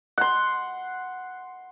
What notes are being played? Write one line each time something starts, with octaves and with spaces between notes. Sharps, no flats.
F#5 C6